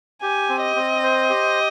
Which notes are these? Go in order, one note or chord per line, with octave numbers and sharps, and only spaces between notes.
G4 G#5
C4
D#5
C4
C5
G4